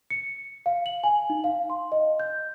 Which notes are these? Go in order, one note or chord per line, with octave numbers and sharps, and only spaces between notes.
C#7
F5
F#7
G#5
D#4
F5
C6
D#5
G6